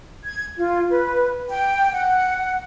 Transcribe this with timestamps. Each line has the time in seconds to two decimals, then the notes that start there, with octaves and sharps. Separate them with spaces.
0.24 G#6
0.57 F4
0.90 B4
1.50 G5
1.93 F#5